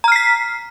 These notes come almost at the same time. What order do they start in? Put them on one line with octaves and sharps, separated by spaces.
A#5 F6 C7 B6